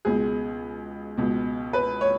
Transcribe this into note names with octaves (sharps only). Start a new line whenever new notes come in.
C#2 B2 G#4
C#2 B2
B4
C#5